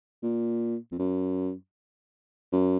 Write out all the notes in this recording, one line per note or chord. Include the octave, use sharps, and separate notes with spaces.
A#2
F2
F#2
F#2